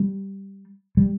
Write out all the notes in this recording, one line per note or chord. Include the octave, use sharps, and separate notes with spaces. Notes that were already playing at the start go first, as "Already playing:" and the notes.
Already playing: G3
G3